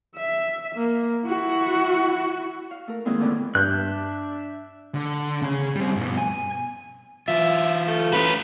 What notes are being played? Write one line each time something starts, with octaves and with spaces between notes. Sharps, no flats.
E5
A#3
E4 F#4
F5
A3 A#4
D#3 F#3 G#3 A#3 C4 E4
F2 A2 D3 F3 B3
G2 D4 E5 F#6 G6
D3
C#3 C#4
G3 C4
G2 B2
G#5
E3 F4 E5
A3
C#4 B4